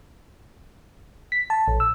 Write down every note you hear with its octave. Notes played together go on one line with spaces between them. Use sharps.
B6
A5
A#1
E6